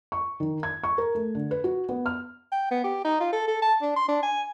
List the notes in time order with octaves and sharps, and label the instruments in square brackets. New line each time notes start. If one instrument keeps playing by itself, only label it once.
[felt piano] C#6
D#3
G#6
C#6
A#4
A3
D3
B4
F#4
B3
F6
[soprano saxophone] G5
B3
G4
D#4
F4
A4
A4
A5
D4
C6
D4
G#5